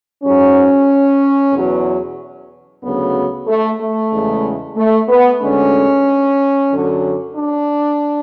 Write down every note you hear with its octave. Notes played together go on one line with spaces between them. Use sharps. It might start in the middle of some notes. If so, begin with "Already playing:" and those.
G#2 F#3 C#4
E2 B2 F#3
D2 C#3 F#3 B3
A3
A3
E2 C#3 G#3
A3
B3
D2 D3 G#3 C#4
F#2 D3 F#3
D4